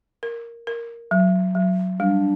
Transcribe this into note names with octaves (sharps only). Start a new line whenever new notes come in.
A#4
A#4
F#3
F#3
G3 D4